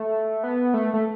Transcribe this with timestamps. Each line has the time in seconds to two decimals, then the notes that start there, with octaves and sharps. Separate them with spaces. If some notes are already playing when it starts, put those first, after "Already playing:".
Already playing: A3
0.44 B3
0.74 A3
0.94 A3